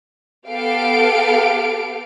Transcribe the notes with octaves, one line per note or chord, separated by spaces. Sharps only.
B3 G4 A4 F5 D7